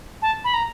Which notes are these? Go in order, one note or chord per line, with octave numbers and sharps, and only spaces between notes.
A5
B5
A#5